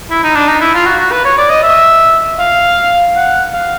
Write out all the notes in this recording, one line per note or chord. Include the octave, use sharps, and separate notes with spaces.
E4
D#4
D4
D#4
E4
F4
F#4
F#4
B4
C#5
D5
D#5
E5
F5
F#5
F5